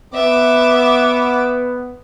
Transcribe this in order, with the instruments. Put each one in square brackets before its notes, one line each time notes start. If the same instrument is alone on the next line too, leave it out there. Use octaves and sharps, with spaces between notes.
[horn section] B3 [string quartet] E5 D6